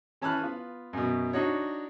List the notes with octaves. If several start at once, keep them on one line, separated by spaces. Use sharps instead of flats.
E3 C#4 A5 B5 F6 F#6
B3 F4
F#2 B2
D4 D#4 F#4 C#5